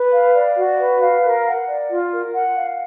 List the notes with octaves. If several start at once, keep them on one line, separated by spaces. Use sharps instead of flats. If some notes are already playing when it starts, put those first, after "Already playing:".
Already playing: B4
F5
D5
F#4
B4
F5
A#4
F#5
D5
F4
A#4
F#5
F5